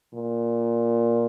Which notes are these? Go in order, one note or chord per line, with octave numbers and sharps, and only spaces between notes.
A#2